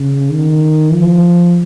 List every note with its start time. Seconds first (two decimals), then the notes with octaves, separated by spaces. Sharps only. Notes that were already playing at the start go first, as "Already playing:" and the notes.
Already playing: C#3
0.31 D#3
0.93 F3